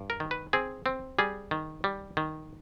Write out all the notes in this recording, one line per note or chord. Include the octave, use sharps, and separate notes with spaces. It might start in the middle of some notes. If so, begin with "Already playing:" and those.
Already playing: G2
A#4
D#3
B4
C4 G#4
C4
G3 G#4
D#3
G3
D#3